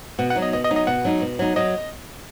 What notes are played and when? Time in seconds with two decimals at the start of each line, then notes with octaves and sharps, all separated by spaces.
0.19 B2 F#5
0.30 F#5
0.36 F#3 D#4
0.42 D#5
0.53 B2 D#5
0.64 D#5
0.70 F#3 D#4
0.76 D#5
0.87 B2 F#5
1.05 F#3 D#4
1.21 B2
1.39 F#3 D#4
1.56 F#3 D#5